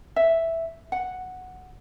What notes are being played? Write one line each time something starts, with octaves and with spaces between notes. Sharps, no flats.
E5
F#5